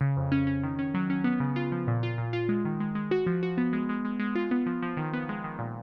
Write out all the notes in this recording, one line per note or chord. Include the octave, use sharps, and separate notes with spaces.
C#3
F2
C#4
C#4
D#3
C#4
F#3
C#4
B3
C#3
F4
F3
A#2
F4
A#2
F4
G#3
D#3
G#3
G#3
F#4
F3
F#4
B3
G#3
G#3
G#3
G#3
F4
B3
F3
F3
D#3
B3
G#3
D#3
A#2